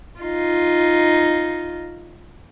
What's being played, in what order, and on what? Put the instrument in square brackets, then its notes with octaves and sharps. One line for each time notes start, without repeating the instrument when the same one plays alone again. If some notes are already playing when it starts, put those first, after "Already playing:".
[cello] D#4 F4